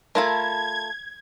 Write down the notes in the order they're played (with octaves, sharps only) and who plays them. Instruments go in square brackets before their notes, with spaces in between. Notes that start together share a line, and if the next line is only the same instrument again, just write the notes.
[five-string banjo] A3 F4 A4 [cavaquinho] A#4 A5 B5 [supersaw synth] G#6